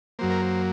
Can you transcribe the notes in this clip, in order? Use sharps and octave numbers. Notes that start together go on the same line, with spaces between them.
F#2 F#3 A#3 C5
A#4
C5